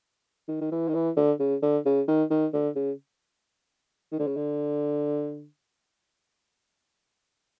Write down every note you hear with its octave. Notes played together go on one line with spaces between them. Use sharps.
D#3
D#3
E3
D#3
E3
D3
C#3
D3
C#3
D#3
D#3
D3
C#3
D#3
D3
C#3
D3